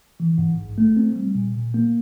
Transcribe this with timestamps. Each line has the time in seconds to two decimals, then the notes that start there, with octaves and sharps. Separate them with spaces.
0.20 E3
0.38 G#2
0.58 A#1
0.78 A3
0.97 C4
1.16 G3
1.35 A#2
1.55 A#2
1.74 A#3